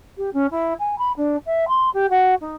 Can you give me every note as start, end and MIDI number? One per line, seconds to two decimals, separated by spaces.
0.17 0.30 67
0.33 0.46 61
0.51 0.74 64
0.79 0.98 80
0.98 1.12 83
1.17 1.36 62
1.46 1.65 76
1.68 1.89 84
1.93 2.09 67
2.10 2.34 66
2.41 2.56 63